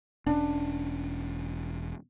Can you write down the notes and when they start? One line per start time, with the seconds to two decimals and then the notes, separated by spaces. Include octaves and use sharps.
0.26 E1 C#4 D4